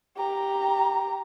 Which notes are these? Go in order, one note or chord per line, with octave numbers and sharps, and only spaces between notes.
G4 A#5